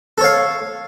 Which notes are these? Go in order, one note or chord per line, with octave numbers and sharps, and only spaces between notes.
A4 C#5 F5